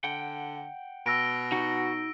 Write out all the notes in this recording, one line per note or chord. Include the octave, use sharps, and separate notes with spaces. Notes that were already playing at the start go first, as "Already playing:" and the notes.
D3 F#5 G5
B2 E6 A#6 D7
D#4 F#4